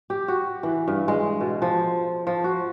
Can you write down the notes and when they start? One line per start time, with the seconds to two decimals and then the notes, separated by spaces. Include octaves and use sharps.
0.10 G4
0.28 F#4
0.63 E3
0.88 G2
1.08 G#3
1.41 B2
1.62 F3
2.27 F3
2.44 F#4